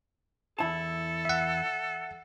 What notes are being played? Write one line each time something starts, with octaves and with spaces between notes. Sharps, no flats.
E2 E4 A4 A5
E5 F#5